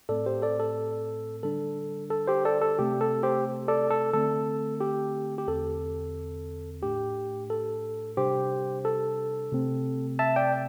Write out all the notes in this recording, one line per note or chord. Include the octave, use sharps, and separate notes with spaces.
A2 A3 C4 A4 D5
G4 C5
A4 D5
A4
D3 G3 D4 A4
A4
G4 C5
A4 D5
A4
C3 A3 C4 G4
A4
G4 C5
A4 D5
A4
D3 A3 C4 A4
G4
G4
E2 D3 C4 A4
A2 A3 D4 G4
A4
C3 G3 D4 G4 C5
A4
C3 A3 C4
E5 A5
D5 G5